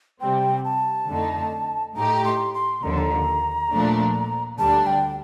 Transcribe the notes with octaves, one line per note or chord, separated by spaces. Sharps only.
C3 G3 C4 G5
A5
F2 D3 A3 D#4
A2 A3 D#4 G4 A#5
C6
C6
D#2 D3 F3 A#5
C6
A#5
A#2 F3 A3 D4
D2 D3 G3 D4 A5
G5